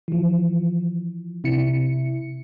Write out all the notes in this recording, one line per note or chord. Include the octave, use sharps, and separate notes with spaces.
E3 F3
C3 E4 C#7